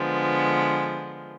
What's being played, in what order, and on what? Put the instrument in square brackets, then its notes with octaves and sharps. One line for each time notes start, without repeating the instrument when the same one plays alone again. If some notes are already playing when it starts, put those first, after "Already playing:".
Already playing: [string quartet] D3 F3 G#3 B3